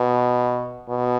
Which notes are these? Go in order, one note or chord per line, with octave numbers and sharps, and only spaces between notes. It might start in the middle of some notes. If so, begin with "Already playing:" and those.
Already playing: B2
B2